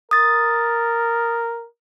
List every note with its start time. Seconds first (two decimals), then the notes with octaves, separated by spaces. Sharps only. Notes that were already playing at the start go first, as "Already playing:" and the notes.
0.11 A#4 D#6 A6